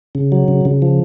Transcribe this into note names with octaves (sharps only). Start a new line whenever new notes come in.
C#3
F#3
C#3
C#3
F3